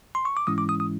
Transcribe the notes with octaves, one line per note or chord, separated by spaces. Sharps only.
C6
C#6
D6
G#2 E3 G#3 C#4 E4 D#6
D6
D#6
D#6